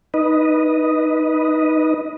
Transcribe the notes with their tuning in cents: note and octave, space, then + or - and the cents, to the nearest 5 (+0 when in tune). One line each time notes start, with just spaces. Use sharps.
D#4 +0 B4 -10 D#5 +0